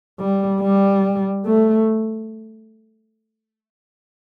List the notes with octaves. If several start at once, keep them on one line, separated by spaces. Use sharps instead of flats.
G3
G3
A3